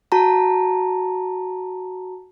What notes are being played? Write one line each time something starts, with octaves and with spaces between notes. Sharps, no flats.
F#4 A5 A#5